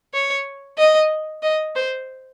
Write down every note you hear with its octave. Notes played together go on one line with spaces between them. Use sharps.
C#5
D#5
D#5
C5